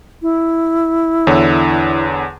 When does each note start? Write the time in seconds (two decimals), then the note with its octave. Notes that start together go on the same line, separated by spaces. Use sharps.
0.22 E4
1.27 E2 D3 C#5